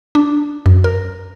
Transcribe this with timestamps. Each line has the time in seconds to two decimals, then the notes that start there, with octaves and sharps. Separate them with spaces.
0.15 D4
0.66 F#2
0.84 A#4